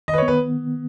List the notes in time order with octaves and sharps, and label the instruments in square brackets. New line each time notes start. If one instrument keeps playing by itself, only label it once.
[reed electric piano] D#3 [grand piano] D#5
[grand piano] B4
C#5
[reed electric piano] B3
[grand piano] B4